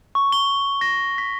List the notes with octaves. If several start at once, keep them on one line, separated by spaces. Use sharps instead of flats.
C#6
G7
A#6
B6